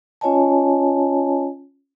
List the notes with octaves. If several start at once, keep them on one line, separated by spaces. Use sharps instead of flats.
C#4 F4 C#5 D#5 G#5 A5